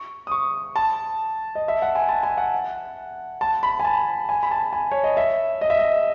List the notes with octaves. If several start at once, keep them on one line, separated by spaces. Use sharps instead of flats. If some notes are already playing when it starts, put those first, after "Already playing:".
Already playing: C#6
D#6
C#6
A5
D#5
E5
F#5
G#5
A5
G#5
F#5
A5
B5
G#5
A5
G#5
B5
A5
G#5
C#5
D#5
E5
D#5
E5
D#5